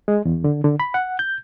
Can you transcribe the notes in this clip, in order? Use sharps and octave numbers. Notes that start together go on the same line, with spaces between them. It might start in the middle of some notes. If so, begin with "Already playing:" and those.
G#3
E2
D3
D3
B5
F#5
G6